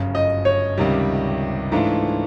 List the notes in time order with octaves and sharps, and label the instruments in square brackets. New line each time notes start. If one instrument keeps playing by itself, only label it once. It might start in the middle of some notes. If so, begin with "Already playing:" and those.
Already playing: [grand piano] G1 F#2 C#3
[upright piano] D#5
C#5
[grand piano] C#2 C3 D#3 G3
G#2 E3 A3 D4 F4